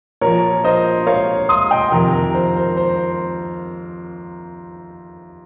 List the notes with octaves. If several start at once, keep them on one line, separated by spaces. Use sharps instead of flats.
A#2 F3 A#4 C#5
C5 D#5
C#5 F5
C6 D#6
D#5 G5
F2 C3 D#3 A#4
A#4
C5
C5
C5